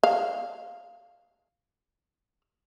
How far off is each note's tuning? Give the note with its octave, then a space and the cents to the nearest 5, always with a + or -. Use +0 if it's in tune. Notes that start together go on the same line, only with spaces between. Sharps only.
F5 +0